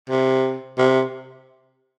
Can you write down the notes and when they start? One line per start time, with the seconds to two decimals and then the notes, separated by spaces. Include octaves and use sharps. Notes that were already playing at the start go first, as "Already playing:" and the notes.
0.10 C3
0.78 C3